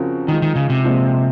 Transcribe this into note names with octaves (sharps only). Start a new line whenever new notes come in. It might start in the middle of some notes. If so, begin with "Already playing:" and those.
Already playing: C#3 F3 C4 F#4 A#4
D#3 F3 G#3 D#4
D#3
C#3
C3
A#2 F3 G#3 C4